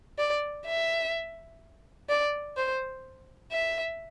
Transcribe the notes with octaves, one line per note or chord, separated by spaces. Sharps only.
D5
E5
D5
C5
E5